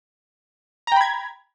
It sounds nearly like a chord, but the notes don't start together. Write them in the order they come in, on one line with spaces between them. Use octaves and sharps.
A#5 G5 B5 G#6